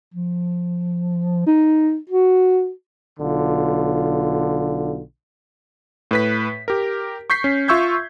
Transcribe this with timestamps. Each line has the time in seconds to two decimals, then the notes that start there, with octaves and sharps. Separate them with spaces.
0.14 F3
1.47 D#4
2.09 F#4
3.19 B1 D3 F4
6.11 A2 B4 B6
6.68 G4 A#4
7.30 C#6 G6 B6 C7
7.44 C#4
7.68 F4 E5 C#6 E6 G6 G#6